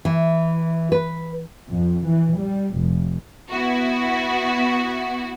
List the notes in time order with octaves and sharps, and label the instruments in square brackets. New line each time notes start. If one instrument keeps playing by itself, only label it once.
[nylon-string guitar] E3
B4
[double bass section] F2
E3
G3
F1
[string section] B3 E4 F#4